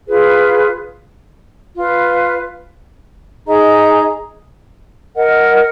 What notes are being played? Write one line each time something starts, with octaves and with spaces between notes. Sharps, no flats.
F4 G#4 B4
F4 B4 F5
D#4 G#4 D#5 A#5
A#4 D#5 F#5